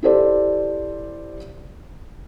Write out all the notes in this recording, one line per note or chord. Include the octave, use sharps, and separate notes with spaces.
E4 G4 A4 C5 D5